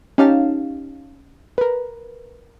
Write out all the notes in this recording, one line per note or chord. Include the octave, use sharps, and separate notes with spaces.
C#4 D#4 G4 C#5 F5 A5
A#4 B4